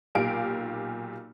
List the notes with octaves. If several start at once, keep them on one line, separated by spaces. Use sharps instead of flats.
B1 A#2 G4 F5 D7